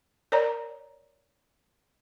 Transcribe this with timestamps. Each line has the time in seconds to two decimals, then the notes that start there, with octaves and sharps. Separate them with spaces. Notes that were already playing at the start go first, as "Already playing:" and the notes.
0.32 A#4 C#5 D5 A#5